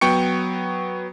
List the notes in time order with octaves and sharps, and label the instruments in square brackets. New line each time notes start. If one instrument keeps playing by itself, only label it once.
[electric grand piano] F#3 B3 G5 C#6 C#7